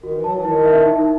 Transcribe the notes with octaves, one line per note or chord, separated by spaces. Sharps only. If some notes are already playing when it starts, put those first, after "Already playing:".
D#3 F#4
E3
F#3 A5
E3
D#3 E4
E5
D#4